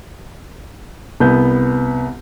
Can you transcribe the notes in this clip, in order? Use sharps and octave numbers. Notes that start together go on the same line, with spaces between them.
C2 B3 G6